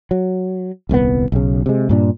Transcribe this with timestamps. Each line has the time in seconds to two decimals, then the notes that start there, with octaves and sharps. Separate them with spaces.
0.11 F#3
0.89 D#1 C2 B2 B3
1.32 B1 C#3
1.66 C3 G#3
1.89 G2 A#2 D4